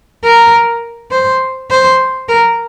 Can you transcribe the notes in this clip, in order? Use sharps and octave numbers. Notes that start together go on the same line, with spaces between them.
A#4
C5
C5
A#4